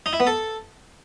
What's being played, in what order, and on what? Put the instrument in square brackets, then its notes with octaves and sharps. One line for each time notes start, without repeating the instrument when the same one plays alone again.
[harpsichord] D#4
E4
B3
A4